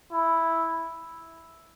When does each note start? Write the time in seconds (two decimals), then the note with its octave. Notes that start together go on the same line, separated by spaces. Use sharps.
0.12 E4